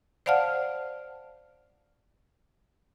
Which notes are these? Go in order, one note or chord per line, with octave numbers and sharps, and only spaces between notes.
C5 D5 F5 F#5 A5 F6